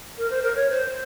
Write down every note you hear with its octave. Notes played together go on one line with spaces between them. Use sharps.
A#4
C5
A#4
C#5
C5